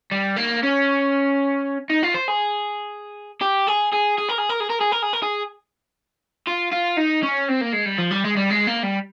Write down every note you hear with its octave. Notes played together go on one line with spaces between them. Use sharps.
G3
A#3
C#4
D#4
F4
C5
G#4
G4
G#4
G#4
G#4
A#4
G#4
A#4
G#4
A#4
G#4
A#4
G#4
A#4
G#4
F4
F4
D#4
C#4
C4
A#3
G#3
G3
F3
G3
G#3
G3
G#3
A#3
G3